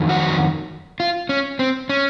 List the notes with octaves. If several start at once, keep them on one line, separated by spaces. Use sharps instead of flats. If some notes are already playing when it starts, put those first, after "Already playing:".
Already playing: F2 D#3 F#3
F#4
F4
C#4
C4
C#4